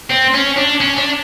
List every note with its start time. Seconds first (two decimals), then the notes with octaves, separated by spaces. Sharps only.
0.10 C4
0.34 C#4
0.57 D4
0.80 C#4
0.97 D4